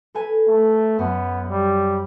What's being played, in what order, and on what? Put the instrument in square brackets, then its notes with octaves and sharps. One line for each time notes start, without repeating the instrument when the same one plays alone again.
[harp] A4 B4 G#5
[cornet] A3
[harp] F#2 [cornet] B3
[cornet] G3